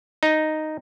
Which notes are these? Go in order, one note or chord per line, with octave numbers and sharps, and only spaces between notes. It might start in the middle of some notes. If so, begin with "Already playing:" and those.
D#4